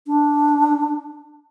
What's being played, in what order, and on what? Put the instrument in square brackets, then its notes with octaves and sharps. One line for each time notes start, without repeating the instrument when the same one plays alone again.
[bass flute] D4